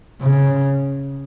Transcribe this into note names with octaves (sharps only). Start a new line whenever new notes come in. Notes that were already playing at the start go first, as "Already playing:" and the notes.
C#3